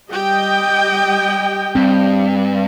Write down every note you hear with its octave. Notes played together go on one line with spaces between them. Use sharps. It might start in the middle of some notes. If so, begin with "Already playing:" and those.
G3 G4 D#5 G5
G2 C4